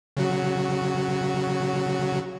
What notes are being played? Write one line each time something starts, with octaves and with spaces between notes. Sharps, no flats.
C#3 F#3 F#4